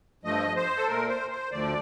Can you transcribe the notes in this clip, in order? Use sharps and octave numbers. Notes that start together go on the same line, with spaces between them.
G2 F3 A3 D#5
C5
A4
A#2 A3 A#4
C5
C5
D2 D3 F3 A3 D5